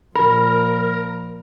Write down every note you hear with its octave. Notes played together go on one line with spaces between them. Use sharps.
A#2 F3 A#4 B5